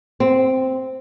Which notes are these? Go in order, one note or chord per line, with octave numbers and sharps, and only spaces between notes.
C4